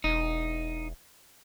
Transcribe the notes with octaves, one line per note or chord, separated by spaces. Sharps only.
E1 D#4